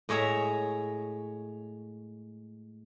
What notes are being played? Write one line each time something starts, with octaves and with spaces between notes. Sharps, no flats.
A2 G#3 C#5 E5 A#5